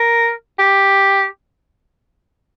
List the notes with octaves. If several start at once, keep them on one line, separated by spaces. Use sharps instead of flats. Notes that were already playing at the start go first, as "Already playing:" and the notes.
Already playing: A#4
G4